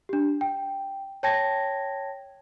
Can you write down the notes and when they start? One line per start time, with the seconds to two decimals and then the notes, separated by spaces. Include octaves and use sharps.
0.09 D4 G4
0.41 G5
1.23 C#5 G5 A5 G#6 A#6